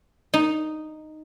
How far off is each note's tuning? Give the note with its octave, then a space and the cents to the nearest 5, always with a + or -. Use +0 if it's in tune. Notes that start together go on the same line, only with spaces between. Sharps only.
D#4 -5